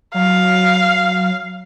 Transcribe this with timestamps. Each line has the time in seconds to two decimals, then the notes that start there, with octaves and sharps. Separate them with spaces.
0.14 F#3 F5